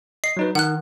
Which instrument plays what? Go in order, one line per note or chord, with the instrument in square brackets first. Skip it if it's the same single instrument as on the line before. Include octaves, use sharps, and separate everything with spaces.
[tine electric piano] D#5 [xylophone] C7
[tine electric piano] F#3 D#4 B4
[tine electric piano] D#3 [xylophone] F#5 F#6